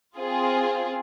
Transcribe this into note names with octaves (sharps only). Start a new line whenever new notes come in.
C4 F4 G#4